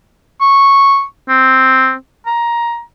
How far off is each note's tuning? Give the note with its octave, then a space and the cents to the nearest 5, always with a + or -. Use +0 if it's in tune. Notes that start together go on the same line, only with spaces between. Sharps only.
C#6 -5
C4 +0
A#5 +15